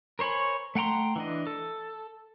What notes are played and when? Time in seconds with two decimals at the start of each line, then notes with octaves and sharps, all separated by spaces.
0.19 A#4 C5 C#5 G#5 B5
0.75 A3 F#5 G5 A#5 C6
1.16 E3 D4 D#5
1.47 A4